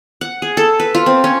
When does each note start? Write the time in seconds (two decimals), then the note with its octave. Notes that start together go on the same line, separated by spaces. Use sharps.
0.21 F#5
0.42 G#4
0.57 A4
0.80 B4
0.95 F4
1.06 C4
1.24 C#4